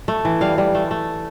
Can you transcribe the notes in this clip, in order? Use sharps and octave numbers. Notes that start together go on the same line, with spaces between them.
A3
E3
G3 F5
G3
A3
A3